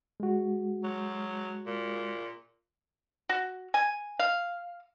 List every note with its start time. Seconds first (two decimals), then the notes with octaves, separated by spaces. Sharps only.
0.20 G#3 F#4
0.83 F#3
1.67 A#2
3.29 F#4
3.74 G#5
4.19 F5